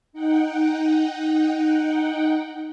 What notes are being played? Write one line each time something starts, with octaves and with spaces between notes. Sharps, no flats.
D#4 F#5 G5